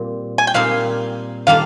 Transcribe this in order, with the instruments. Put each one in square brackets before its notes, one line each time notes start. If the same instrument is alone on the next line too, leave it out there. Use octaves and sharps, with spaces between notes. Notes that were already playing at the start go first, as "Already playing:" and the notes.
Already playing: [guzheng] A#2 G3 C4
[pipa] G#5
G5
[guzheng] A#2 G3 C4 D#4 [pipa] F5
[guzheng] D#3 G3 A#3 D4 F4 [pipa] F5